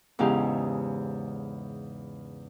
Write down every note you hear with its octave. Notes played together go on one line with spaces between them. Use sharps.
E2 G#2 C#3 G4 F5